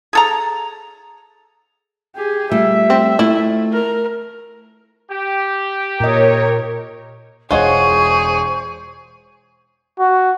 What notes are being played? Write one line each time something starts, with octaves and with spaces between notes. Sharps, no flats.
G#4 A4 A#5
G4 G#4
G3 A3 F4 E5
C4
A3 E4 F4
A#4
G4
A#2 A#4 C#5 D#5
E1 F4 F#4 G#4 C5 C#5 D#5 C#6
F#4